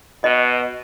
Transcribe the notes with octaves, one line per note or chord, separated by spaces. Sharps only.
B2 D#5